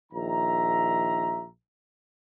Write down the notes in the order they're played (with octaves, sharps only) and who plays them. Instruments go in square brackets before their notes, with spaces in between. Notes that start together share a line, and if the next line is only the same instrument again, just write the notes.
[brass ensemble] A#1 D#3 E5 A#5